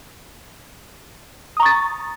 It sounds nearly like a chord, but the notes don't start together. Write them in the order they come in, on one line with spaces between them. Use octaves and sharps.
D#6 A#5 C#6 A6